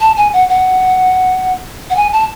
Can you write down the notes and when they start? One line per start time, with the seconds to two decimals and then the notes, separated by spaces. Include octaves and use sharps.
0.01 A5
0.17 G#5
0.33 F#5
0.49 F#5
1.90 F#5
1.96 G#5
2.13 A5